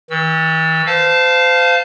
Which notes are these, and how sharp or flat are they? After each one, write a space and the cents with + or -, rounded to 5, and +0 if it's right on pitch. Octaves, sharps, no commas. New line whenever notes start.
E3 -45 E6 +0
C5 -30 F5 +0 A5 +0